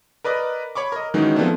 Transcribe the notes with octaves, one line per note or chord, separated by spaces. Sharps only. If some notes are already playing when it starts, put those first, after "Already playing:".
A#4 B4 D5 D#5
C#5 B5 C#6 D6
A#4 D#5
D#3 E3 F#3 G#3 C#4 D#4
F3 A3 B3 C4 D4 E4